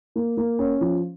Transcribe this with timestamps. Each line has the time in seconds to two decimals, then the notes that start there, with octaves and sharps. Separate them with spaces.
0.16 A#3
0.37 A#3
0.59 C#4
0.81 F3